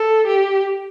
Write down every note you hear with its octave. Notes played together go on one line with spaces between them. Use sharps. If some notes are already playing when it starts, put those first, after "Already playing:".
Already playing: A4
G4